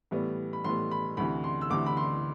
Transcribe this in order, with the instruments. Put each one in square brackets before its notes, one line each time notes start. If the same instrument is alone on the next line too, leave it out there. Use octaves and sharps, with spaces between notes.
[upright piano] A2 E3 G3 B3
B5
A2 E3 G3 B3 C6
B5
D2 C3 E3 B5
C6
E6
D2 C3 E3 D6
B5
C6